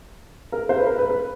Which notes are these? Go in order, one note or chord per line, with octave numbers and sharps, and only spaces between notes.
A#4
C5
B4
A#4
B4
B4